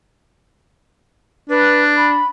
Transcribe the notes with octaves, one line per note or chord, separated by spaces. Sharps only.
D4 B4
B5